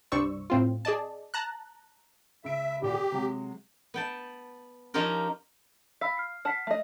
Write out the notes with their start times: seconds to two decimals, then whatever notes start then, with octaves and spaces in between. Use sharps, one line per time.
0.12 C2 G2 C5 D5 C#6 E6
0.50 A2 C4 F4
0.85 G#4 D5 D#5 A5
1.34 A5 A#5 F#6
2.44 C#2 E5 D7
2.82 D#1 A#2 F#4 G4
2.94 G#4
3.12 C3 F#3 G#3
3.94 B3 G5 A5
4.94 F3 C#4 D#4 F4 G4 A#4
6.01 F5 B5 E6 B6
6.17 F6 C7
6.45 F#5 A5 F6 B6 C7
6.67 A3 D#5 E5